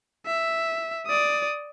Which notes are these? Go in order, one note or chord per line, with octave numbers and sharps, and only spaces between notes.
E5
D5 D#6